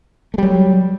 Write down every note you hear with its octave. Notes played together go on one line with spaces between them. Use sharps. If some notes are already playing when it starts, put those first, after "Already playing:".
F#3 G3 A3